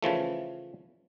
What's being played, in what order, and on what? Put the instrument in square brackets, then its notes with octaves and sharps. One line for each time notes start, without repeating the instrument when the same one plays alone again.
[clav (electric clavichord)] C#3 E3 F3 A3